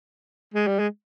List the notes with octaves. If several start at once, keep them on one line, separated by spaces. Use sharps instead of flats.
G#3
G3
G#3